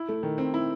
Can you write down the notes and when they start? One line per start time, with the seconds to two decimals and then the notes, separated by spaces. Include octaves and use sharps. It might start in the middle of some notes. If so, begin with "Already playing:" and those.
Already playing: E4
0.09 A3
0.23 D#3
0.38 C4
0.54 E4